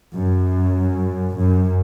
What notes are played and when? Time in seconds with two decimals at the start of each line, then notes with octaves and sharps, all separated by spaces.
0.15 F#2
1.37 F#2